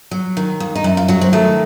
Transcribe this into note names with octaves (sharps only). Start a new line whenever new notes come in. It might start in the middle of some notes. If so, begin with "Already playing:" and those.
F#3
D#3
D#2
D#4
F#2 E4
F4
F#3 F#4
C4
D#3 A3